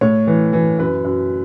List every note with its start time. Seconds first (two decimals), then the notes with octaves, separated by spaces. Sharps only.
0.01 A2 C#5
0.27 E3
0.53 E3
0.79 F#2 B4
1.05 F#2